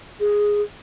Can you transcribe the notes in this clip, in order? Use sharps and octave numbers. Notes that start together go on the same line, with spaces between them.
G#4